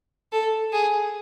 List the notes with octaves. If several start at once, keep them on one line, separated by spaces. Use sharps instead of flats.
A4
G#4